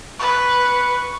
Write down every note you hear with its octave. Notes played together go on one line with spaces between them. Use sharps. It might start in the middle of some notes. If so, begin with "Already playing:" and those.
B4 C#6